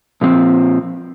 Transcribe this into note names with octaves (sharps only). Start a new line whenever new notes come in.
A#2 F3 C4